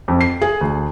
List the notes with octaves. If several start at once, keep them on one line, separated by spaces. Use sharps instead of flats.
F2
C7
G#4
D2